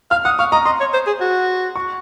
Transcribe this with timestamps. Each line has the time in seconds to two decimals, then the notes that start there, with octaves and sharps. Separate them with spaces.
0.11 F5 F6
0.25 F#5 D#6
0.39 F5 C#6
0.52 D#5 A#5
0.66 D#5 C6
0.80 C#5
0.94 C5
1.07 G#4
1.20 F#4
1.76 C#6